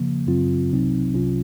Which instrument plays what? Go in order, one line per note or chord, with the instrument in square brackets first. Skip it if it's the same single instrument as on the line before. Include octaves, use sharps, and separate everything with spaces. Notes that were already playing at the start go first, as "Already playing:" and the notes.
Already playing: [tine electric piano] C#3 F3 A#3
F#2 C#3 F#3 C4 F4
C2 C3 F#3 C4 D#4
C2 C3 F#3 C#4 F4